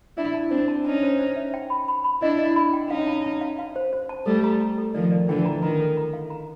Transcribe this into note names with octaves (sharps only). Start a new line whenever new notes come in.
D4 E4 E5
A5
C4 D4 C5
A5
C#4 D#4 A5
C5
C5
E5
G5
B5
B5
B5
D4 E4 D#5
D#5
B5
G5
C#4 D#4 F5
A5
A5
F5
F5
C5
C5
A5
G3 A3 A4
A#5
A#5
A4
D#3 F3 D5
D5
D3 E3 G5
A#5
D#3 A#5
A4
A#5
F5
A#5